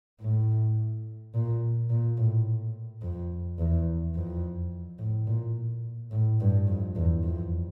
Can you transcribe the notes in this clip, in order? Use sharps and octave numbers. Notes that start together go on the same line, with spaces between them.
A2
A#2
A#2
A2
F2
E2
F2
A2
A#2
A2
G2
F2
E2
F2